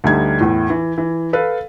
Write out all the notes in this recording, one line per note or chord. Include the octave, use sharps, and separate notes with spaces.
D2 D3 G3 D#4 G#6
E2 A2
E3
E3
A4 B4 F5